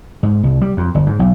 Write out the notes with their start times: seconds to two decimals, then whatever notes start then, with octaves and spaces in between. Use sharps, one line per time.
0.23 G#2
0.43 C2
0.61 G3
0.77 F2
0.95 G1
1.06 G#2
1.19 B1